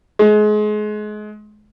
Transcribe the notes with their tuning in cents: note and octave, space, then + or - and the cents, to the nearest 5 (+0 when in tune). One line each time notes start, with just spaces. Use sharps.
G#3 +30